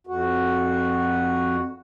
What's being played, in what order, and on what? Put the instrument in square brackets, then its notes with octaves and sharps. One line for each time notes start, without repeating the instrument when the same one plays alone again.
[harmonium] F2 F#4